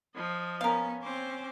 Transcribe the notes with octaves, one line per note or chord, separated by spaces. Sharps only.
F3 D#5
B3 C#4 A#4 F5
C4 C#4 C5 D6